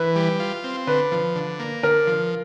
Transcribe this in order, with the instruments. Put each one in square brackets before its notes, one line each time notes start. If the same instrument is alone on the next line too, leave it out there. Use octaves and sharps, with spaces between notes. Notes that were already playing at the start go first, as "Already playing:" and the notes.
Already playing: [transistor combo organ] E3 [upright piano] B4
[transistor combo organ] G3
F4
C4
[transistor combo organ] D3 [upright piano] B4
[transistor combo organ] F3
D3
A#3
[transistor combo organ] D3 [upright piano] A#4
[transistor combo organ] F3